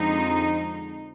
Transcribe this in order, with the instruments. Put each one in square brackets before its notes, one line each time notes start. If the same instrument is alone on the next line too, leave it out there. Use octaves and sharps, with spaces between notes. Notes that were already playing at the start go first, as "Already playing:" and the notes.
Already playing: [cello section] F2 D3 G#3 C4 D#4